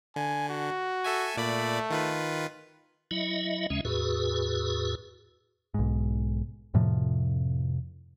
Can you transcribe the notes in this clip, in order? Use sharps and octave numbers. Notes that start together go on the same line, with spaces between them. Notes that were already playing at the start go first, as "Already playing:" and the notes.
D3 G#5
F#4
A4 E5 G#5
A#2 A3 D5 B5
D#3 F4 B4
F#3 E4 D#5 E5
D#2 C#3 G#3 C#4 E5
E2 A2 F#4 G#4 B4
B1 G#2
F2 A2 C3 F3